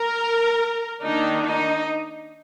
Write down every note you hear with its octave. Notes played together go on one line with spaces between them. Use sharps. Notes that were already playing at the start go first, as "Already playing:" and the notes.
Already playing: A#4
D#3 A#3 D4 D#4
D#4